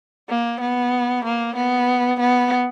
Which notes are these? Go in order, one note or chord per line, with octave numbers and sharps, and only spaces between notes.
A#3
B3
A#3
B3
B3